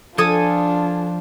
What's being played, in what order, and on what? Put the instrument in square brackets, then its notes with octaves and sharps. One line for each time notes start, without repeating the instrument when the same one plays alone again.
[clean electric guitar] F3 [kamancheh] D4 F4 [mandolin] A4 G#5 D#6